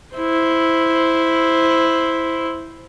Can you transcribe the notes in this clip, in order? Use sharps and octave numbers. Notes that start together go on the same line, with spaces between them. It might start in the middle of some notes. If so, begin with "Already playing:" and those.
E4 C5